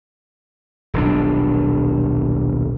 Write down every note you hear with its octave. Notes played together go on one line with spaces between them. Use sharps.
D#1 B1 D4